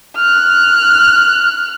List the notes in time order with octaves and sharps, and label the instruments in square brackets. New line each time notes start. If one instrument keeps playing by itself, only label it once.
[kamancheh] F6 F#6